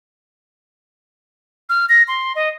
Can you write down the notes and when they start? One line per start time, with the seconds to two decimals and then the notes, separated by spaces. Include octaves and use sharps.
1.69 F6
1.89 A#6
2.08 C6
2.36 D#5